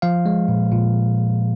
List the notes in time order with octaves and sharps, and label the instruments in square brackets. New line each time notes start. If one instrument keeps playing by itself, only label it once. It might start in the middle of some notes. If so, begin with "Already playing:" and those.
[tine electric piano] F3 F5
G#3
A#2
A#2